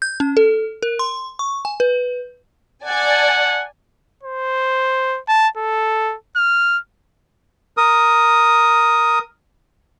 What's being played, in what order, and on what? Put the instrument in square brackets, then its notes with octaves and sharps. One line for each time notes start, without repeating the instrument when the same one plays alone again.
[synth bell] G6
C#4
A4
A#4
C6
C#6
G#5
B4
[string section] D5 G#5 A5 [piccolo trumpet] F#5
[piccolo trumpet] C5
A5
A4
F6
[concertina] A#4 D#6